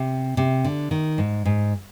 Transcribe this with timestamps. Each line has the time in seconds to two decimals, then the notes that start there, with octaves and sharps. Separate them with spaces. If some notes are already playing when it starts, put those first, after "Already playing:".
Already playing: C3
0.37 C3
0.64 D3
0.91 D#3
1.18 G#2
1.45 G#2